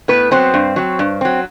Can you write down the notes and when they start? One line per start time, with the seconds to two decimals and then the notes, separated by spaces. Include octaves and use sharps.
0.08 A2 B3 B4
0.31 F#3 B3 C4 C5
0.54 G2
0.76 F#3 C4
0.99 G2
1.21 F#3 C4